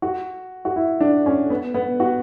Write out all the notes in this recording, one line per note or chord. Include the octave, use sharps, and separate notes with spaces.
F#4
F#4
E4
D4
C#4
B3
B3
F#4